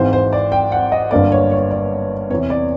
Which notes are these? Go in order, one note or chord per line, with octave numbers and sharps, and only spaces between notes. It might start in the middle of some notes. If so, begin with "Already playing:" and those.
Already playing: G#1 G#2 E3 C5
C5
D5
G5
F#5
D#5
G1 G2 D3 F#3 A#3 D5
C#5
C#5
D5
E2 C3 E3 C#5
D5